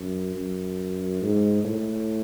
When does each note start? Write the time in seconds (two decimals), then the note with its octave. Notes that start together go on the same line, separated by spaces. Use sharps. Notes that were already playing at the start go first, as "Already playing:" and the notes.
Already playing: F#2
0.35 F#2
1.22 G#2
1.64 A2